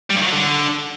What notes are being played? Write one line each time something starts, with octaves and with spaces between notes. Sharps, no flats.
G3
G2
D#3
F#3
D3